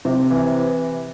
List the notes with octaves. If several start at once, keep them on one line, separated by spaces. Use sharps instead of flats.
C3
E3